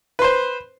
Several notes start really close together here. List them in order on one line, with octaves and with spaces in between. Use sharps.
B4 C6 C5